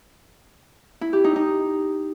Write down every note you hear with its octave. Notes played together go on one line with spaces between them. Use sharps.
E4
G4
D#4
D#4